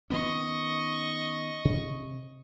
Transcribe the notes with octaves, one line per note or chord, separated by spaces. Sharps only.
D#3 B3 C#4 D#5 C#6
C3